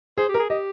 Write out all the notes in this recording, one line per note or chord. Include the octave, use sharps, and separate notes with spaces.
G#4 C5
G4
A#4
G#4
G4 D#5